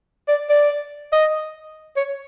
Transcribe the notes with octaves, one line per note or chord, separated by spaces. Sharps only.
D5
D5
D#5
C#5